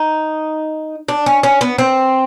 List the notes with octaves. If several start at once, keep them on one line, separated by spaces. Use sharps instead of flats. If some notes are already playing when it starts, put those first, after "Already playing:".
Already playing: D#4
D4
C#4
C#4
B3
C4